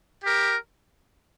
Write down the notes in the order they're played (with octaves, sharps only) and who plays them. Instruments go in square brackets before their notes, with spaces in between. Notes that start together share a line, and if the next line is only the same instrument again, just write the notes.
[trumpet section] G4 A#4